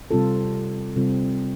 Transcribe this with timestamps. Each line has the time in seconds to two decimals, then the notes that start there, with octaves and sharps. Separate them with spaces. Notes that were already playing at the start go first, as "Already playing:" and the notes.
0.11 C3 G3 C4 F4 A4
0.96 C3 G3 C4 F4 A4